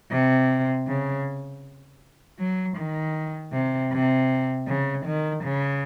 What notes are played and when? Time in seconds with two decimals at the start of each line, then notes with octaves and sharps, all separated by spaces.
0.11 C3
0.88 C#3
2.39 F#3
2.77 D#3
3.53 C3
3.92 C3
4.68 C#3
5.06 D#3
5.44 C#3